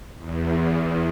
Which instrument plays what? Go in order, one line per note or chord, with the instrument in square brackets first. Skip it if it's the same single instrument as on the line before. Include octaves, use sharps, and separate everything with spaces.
[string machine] E2